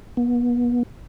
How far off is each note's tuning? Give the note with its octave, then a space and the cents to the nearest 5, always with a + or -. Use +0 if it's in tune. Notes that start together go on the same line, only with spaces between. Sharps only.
B3 -35